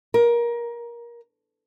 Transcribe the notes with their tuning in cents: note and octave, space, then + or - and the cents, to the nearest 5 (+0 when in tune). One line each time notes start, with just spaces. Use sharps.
A#4 +20